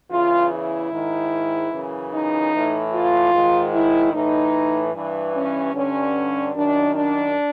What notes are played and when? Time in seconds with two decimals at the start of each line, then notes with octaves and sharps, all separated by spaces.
0.11 E2 C#3 E3 F4
0.52 E4
0.92 G#2 D#3
1.72 F#2 C#3 E3
2.12 D#4
2.53 A2 E3
2.93 F4
3.33 G#2 D#3
3.73 E4
4.13 A2 E3 D#4
4.94 G2 E3
5.35 C#4
5.74 G2 D3 C#4
6.54 F#2 D#3 D4
6.94 D4